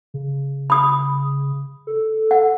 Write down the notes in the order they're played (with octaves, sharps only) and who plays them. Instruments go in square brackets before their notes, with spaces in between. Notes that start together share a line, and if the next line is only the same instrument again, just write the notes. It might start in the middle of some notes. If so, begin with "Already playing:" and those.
[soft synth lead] C#3
[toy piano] B5 D#6
[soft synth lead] A4
[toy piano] F#5